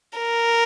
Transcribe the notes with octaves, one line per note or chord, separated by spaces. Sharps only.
A#4